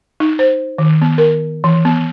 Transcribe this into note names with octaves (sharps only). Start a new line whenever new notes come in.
D#4
C5
D#3
B3
A#4
E3
B3